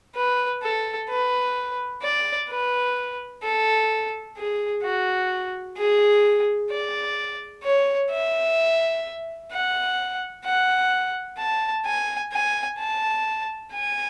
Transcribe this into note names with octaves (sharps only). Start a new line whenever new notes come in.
B4
A4
B4
D5
B4
A4
G#4
F#4
G#4
D5
C#5
E5
F#5
F#5
A5
G#5
G#5
A5
G#5